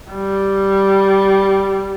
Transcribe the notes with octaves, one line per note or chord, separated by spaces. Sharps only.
G3